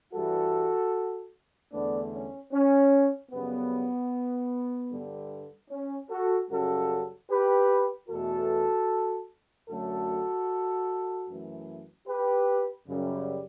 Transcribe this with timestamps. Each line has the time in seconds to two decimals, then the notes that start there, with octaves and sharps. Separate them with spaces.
0.12 G2 E3 G3 F#4 A4
1.72 E2 D3 A3 B3 D4
2.11 C#4
2.52 C#4
3.31 F#2 C#3 G3 B3
4.90 G2 D3 G3
5.69 C#4
6.10 F#4 A4
6.50 F#2 C#3 G3 F#4 A4
7.29 G4 B4
8.08 E2 B2 A3 F#4 A4
9.68 F#2 D3 F#3 A3 F#4 A4
11.28 F#2 E3 A3
12.07 G4 B4
12.87 F#2 C#3 G3